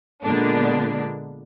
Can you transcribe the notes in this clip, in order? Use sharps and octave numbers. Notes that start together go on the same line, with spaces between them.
A#2 D3 G#3 A#3 B3 D4